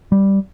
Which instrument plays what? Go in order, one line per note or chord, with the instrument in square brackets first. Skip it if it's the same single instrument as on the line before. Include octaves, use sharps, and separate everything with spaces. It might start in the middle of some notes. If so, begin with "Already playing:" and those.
[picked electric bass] G3